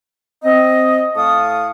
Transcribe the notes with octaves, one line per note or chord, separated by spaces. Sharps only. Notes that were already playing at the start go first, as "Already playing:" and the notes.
C4 D#5
A2 F5 A5 C#6 D#6